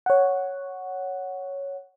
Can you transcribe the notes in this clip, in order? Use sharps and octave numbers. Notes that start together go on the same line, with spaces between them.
C#5 F#5